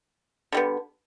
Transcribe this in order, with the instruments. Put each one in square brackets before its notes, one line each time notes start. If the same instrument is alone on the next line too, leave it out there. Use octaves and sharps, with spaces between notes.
[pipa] D3 G3 B3